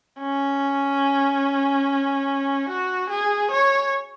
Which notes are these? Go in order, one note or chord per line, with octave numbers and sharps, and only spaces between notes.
C#4
F#4
G#4
C#5